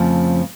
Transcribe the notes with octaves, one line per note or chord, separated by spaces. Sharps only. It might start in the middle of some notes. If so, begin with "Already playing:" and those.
Already playing: F2 C#3 F3 A3